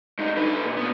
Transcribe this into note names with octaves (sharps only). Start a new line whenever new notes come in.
G2 D#4
D3 B4
A#2
A#2 B3